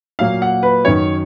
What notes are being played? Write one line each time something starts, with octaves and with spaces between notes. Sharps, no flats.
A#2 F#3 A#3 F5
F#5
B4
F#2 D#3 F#3 C#4 C#5